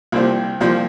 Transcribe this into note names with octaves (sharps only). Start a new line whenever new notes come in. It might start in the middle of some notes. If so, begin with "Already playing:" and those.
C2 A#2 F3 C4 G4
C2 A#2 F3 C4 G4